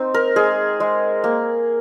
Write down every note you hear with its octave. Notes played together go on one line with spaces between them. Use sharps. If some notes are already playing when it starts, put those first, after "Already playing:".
Already playing: C4 D#4
A#4
G#3 G#4
G#3
A#3